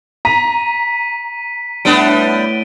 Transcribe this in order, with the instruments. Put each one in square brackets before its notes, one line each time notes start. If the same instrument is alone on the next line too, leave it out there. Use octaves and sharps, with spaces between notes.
[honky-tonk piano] A#5 [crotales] B6 D#7
[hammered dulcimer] A2 [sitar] G3 B3 D4 [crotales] D7 D#7 G7